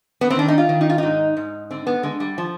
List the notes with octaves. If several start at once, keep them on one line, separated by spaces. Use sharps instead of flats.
B3
C4
D#3 D4
D#4
F4
D#3
D#4
F4
G#2 D#4
G#2
D3 C4
B3
D3 G#3
G3
F3